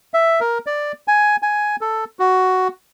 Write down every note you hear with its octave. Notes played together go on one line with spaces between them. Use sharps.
E5
A#4
D5
G#5
G#5
A4
F#4